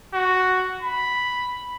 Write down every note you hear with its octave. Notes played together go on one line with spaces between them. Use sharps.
F#4
B5